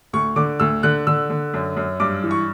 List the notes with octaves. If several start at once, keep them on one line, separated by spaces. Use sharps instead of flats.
D2 C#6
D3 D6
D2 E6
D3 F#6
D3 E6
D3
F#2
F#2
G2 D6
E3
C#6